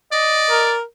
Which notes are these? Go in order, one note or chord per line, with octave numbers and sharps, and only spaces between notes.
D5 D#5
A#4